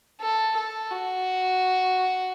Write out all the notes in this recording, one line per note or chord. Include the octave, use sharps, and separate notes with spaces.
A4
A4
F#4